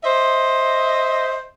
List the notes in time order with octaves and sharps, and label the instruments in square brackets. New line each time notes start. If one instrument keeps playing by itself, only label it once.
[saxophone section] C5 D#5 E5